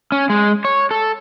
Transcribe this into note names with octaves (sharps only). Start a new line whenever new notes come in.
C#4
G#3
C#5
A4